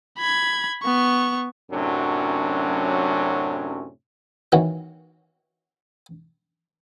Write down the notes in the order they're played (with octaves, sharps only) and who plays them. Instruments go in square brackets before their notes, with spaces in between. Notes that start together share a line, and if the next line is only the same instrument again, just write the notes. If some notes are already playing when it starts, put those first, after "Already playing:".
[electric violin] B5 G#6
B3 C#6
[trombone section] F#2 A2 C3 F#3 C#4 D4
[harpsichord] D#3 E3 A#3 B3 C#4 F#4